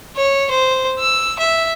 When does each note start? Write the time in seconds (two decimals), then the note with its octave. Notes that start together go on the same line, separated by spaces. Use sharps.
0.16 C#5
0.50 C5
0.99 E6
1.39 E5